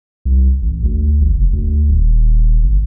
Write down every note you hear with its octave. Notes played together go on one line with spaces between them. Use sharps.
C2
A1
D2
G#1
F1
D2
D#1
G1